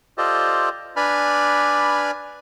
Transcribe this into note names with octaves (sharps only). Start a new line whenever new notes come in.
F4 G4 A4 C5 D5 D#5
D4 B4 D5 G#5 B5 F6